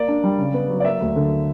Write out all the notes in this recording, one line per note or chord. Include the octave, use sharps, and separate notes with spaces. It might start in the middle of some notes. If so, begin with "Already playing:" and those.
Already playing: A#3 D5
D4
G3
C#3
B3
F#3
D5
A#3 E5
D2
D3